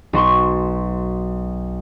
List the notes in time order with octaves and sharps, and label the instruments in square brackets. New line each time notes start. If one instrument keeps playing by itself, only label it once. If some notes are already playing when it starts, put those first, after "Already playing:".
[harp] B1 F#4 C6 C#6